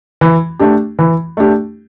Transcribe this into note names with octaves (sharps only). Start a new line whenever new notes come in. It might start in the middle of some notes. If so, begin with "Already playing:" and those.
E3
A3 D4 G4
E3
A3 D4 G4